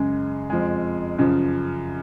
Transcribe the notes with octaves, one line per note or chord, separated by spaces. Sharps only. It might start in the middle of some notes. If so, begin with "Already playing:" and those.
Already playing: F#2 C#3 G#3
F2 F3 G#3
F#2 C#3 F3